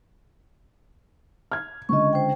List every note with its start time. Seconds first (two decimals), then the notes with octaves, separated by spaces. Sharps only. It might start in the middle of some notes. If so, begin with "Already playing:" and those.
1.52 F6 G#6
1.89 C#2 D3 D#5 C#6
2.13 C5 G5